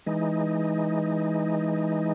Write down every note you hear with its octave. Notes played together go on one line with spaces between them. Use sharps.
E3 G#3 D#4